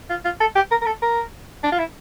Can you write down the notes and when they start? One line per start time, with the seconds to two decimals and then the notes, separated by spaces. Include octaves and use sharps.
0.10 F4
0.25 F4
0.40 A4
0.55 G4
0.71 A#4
0.82 A#4
0.86 A4
1.02 A#4
1.63 D4
1.72 F4
1.79 E4